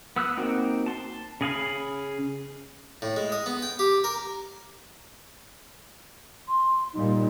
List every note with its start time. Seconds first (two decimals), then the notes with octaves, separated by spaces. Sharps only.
0.16 B3 E6 F#6
0.37 A#3 C4 D#4 F#4
0.86 A5 C6
1.41 C#3 G#4 F5 B5
3.02 A2
3.16 G#3
3.32 D#5
3.46 B3
3.62 G5
3.79 G4
4.04 A#4
6.48 C6
6.93 A#2 G3 D#4